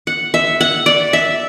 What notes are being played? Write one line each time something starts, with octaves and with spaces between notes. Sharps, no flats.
F#5
E5
F#5
D5
E5